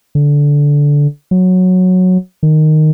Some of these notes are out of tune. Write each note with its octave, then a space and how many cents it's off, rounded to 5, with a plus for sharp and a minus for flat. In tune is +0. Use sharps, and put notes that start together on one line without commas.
D3 -15
F#3 -10
D#3 -10